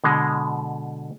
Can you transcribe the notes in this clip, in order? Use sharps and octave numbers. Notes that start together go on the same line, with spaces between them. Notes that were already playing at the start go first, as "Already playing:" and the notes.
B2 D3 G#3